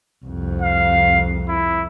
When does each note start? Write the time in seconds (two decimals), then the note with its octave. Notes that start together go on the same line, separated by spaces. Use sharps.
0.24 C2 F2
0.62 F5
1.49 E4